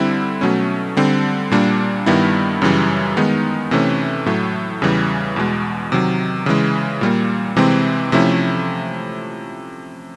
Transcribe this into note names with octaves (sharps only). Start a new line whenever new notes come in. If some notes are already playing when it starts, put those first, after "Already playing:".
Already playing: D3 G3 C4 E4
B2 F#3 A3 C#4
D3 G3 C4
A#2 G3 A#3 D4
G2 D#3 G3 B3 E4
F#2 C#3 E3 G3
D#3 G#3 B3 D#4
C3 E3 A3 C#4
A2 F#3 A3
E2 C#3 E3 G3
E2 B2 G#3
C3 D#3 F#3
C#3 E3 G#3
A#2 G3 A#3
C3 E3 G#3 C4
C3 F3 A3 C#4 E4